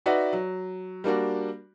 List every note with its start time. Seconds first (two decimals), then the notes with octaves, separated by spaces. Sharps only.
0.06 D#4 F#4 B4 D5 E5 F#5
0.33 F#3
1.04 G3 A#3 D4 F#4